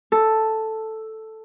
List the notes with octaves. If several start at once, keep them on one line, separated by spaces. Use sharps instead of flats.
A4